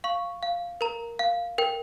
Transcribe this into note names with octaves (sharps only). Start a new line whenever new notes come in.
F5 C#6
F5
A#4 A#5
F5
A#4 G5